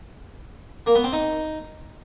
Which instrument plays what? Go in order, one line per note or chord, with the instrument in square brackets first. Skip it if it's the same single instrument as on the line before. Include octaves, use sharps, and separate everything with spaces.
[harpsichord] A#3
B3
C4
D#4